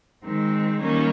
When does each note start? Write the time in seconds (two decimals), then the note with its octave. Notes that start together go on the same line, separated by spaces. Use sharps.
0.24 D#3 G#3 C4
0.80 D#3 G3 A#3 C#4